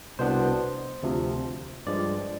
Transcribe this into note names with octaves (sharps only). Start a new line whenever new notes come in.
C2 B2 B3 D4 C5
D2 C3 F3
G2 F3 G#3 D5